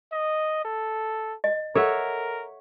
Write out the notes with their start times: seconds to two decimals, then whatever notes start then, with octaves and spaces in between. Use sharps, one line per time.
0.12 D#5
0.65 A4
1.44 D#5
1.75 A4 A#4 C#5 E5 F#5